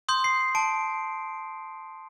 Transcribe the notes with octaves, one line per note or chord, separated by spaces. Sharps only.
C6 D#6 G6
C7
A5 D7